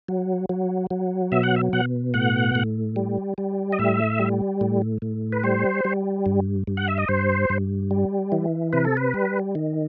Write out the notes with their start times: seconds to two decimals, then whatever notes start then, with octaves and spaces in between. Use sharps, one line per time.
0.08 F#3
0.49 F#3
0.91 F#3
1.32 B2 E5
1.43 F#5
1.56 E5
1.73 B2 F#5
2.14 A2 F#5
2.55 A2
2.96 G3
3.38 G3
3.72 D#5
3.79 A2 E5
4.20 G3
4.61 A2
5.02 A2
5.32 B4
5.44 G3 C5
5.85 G3
6.26 G2
6.67 G2
6.77 F#5
6.88 E5
6.98 D#5
7.08 G2 C5
7.50 G2
7.91 G3
8.32 E3
8.73 C3 B4
8.85 A4
8.97 B4
9.14 G3
9.55 D#3